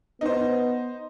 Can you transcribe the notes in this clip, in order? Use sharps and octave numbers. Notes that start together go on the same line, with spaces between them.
B3 D#4 C5